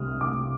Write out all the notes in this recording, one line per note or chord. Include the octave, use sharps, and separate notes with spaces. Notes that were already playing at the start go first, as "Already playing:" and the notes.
Already playing: C2 C3 G3 D#6 F6
D6